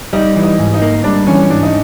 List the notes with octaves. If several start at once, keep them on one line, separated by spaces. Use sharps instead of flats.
G3 D#4
E3
D#4
G#2
D#4
A#3
G3 D4
E3 C#4
G#2 D4
D#4